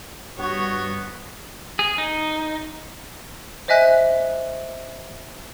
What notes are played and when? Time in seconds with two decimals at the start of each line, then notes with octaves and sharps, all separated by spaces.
0.39 G2 B3 F#4 C#5
1.79 G#4
1.98 D#4
3.68 C5 D#5 E5 G#5 F#6 B6